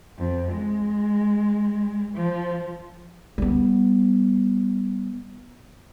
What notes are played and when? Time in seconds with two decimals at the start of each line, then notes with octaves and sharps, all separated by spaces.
0.18 F2
0.52 G#3
2.14 F3
3.38 G3 B3